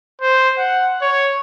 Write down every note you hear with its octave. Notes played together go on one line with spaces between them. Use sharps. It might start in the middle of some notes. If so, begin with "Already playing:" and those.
C5
F#5
C#5